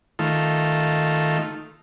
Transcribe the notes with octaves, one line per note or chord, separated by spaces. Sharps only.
D#3 A3 F4